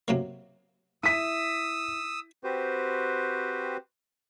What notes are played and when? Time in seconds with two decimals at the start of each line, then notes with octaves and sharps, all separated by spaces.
0.08 C3 F#3 A#3
1.03 E4 D#6 E6 B6 D#7
2.44 C4 F#4 G4 B4 C5